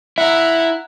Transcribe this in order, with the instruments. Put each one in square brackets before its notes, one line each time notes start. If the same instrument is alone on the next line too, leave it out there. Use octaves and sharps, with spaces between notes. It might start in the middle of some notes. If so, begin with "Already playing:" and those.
[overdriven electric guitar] E4 [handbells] E5 [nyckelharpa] F#5 A#5